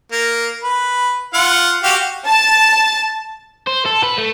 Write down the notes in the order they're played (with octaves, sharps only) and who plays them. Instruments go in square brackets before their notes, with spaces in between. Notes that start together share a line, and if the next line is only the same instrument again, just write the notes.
[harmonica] A#3
B4
F4 F#5
F#4 G4 F5
[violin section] A5
[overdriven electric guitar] C5
A4
B4
A3